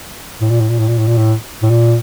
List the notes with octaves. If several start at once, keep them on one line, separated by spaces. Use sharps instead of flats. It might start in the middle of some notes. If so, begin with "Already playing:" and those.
A2
A#2
A2
A#2
A2
A#2
A2
A#2
A2
A2
A#2